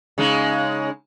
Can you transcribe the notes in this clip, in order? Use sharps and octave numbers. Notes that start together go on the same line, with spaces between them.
C#3 G#3 D#4